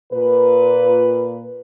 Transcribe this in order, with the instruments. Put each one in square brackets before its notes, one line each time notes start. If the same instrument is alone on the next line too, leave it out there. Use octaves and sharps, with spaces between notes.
[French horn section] A#2 B4